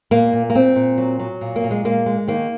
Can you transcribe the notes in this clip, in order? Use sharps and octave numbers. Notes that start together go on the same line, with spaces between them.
A#2 A#3
A#2
A#3
A#2 C4
A#2
F#3
F#3
A#2
A#3
A#2
G#3
G#3 A#3
G#3
D#3 A#3